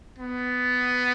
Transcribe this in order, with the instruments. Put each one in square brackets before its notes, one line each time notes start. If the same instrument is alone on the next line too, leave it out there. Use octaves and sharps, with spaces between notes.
[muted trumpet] B3